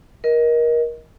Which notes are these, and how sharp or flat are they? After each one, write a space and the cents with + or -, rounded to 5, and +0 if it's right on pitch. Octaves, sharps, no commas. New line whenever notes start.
A#4 +25 D#5 +15